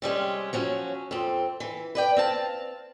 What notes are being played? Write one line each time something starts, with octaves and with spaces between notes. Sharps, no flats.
C3 G3 G#3 C#4
F3 F#3 C#4
F2 C4
E3
B4 D5 G5
C4 F5 A5